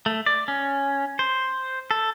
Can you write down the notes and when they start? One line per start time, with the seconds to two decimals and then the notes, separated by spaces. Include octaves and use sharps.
0.06 A3
0.26 D5
0.48 C#4
1.19 C5
1.91 A4